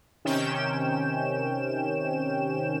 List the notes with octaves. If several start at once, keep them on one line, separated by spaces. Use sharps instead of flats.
C3 D#3 C#4 G5 E7